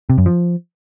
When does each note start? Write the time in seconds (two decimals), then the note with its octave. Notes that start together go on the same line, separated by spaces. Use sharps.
0.10 C3
0.18 F#2
0.26 F3